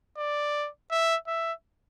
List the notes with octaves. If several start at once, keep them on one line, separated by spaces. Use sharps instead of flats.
D5
E5
E5